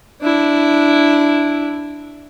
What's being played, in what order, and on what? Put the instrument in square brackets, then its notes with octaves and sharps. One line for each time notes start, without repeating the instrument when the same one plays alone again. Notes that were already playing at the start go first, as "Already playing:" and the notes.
[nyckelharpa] D4 E4